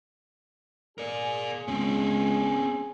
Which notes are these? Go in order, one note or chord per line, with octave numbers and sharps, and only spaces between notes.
G#4 A#4 D5
C#2 C4 C#4